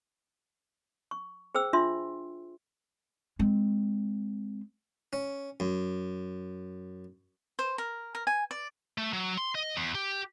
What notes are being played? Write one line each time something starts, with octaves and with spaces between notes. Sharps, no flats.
C#6
G#4 C5 G5 E6
D4 F4 E5 C6
G#3 C4
C#4
F#2
C5
A#4
A#4
G#5
D5
A3
F#3
C6
D#5
E2
G4